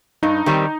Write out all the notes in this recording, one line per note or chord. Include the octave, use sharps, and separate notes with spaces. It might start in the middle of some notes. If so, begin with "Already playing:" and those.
G2 D#4
D#3 G3 C4